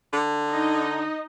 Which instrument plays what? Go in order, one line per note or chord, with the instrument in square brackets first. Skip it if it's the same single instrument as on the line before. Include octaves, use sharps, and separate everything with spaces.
[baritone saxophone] D3
[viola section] D#4 D#5